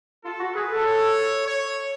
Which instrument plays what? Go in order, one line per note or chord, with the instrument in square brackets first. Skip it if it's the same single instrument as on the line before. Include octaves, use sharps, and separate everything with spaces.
[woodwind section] F4 [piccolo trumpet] A4
[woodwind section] F#4
[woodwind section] G#4 [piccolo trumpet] B4
[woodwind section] A4
[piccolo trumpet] C#5
C#5